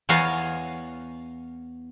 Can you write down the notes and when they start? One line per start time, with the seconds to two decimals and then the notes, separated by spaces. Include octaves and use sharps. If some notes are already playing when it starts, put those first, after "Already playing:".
0.09 E2 B3 C#5 F5 G#5 A#5